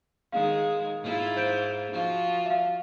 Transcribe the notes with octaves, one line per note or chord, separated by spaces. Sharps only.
D#3 G#3 F5
G#2 E4 F4
C5 G6 D7
F3 F4 F#4
E5 F5